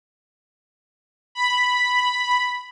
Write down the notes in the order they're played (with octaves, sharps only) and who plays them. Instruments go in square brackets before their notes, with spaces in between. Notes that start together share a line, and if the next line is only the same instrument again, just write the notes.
[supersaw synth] B5